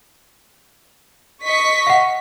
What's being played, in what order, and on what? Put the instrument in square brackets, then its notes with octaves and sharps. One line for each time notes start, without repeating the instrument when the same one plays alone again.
[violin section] D#5 C#6 B6
[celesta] F5 F#5